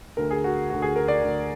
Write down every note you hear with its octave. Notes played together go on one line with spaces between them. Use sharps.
D2 D3 A#4
G#4
F#4
D2 D3 F#4
G#4
A#4
D5
D2 D3